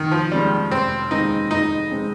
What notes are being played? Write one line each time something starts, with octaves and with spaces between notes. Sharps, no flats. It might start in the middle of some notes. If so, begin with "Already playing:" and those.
Already playing: F1 D#3
F3
D#2 C#3 G3 G#3 C4
F1 C4
D#2 C#3 G#3 C4 D#4
F1 D#4
C#3 G#3 C4